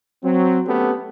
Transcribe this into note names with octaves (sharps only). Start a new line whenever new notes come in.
F#3 C4
A3 B3 C#4 G4 A4